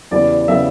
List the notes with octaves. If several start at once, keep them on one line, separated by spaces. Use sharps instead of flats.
E2 C#3 G3 B3 D5
C#3 G3 B3 E5